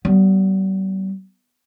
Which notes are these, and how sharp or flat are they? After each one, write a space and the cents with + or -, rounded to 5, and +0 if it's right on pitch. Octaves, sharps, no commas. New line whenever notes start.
G3 -40 B3 -10